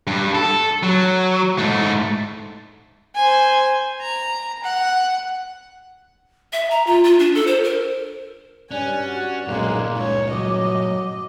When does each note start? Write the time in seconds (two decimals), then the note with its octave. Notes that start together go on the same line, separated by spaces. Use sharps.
0.07 G2
0.35 A4
0.83 F#3
1.59 G#2 A3
3.15 C5 G#5
4.01 A#5
4.63 F#5
6.53 E5
6.71 A#5
6.87 F4
7.04 F4
7.19 D4
7.35 A4
7.47 C5
7.64 A#4
8.71 G2 C#4 D5 G#5 F#6
9.08 F#4
9.47 B1 G2 A#2 G#3 A#3 D#4
9.97 C#2 C#5
10.31 F#3 D#5 D6